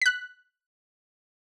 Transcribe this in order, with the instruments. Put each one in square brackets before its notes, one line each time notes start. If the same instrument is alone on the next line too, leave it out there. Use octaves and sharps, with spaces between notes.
[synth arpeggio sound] F#6 B6